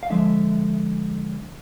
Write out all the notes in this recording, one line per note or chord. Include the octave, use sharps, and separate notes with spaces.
F5
D3 F3 G#3 E5